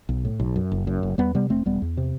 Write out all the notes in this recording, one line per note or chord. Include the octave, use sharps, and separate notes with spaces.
B1
A2
B1
F#2
F#1
F#2
F#1
E2 G3 B3
C3 G3 B3
E1 A3 C4
E1 G3 B3
E2
C3